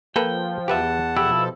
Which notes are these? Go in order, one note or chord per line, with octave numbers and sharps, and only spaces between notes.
F3 A#3 A4 B4 G5
E2 G4 B4 E5 F#5 A5
B2 F3 E4 G4 A4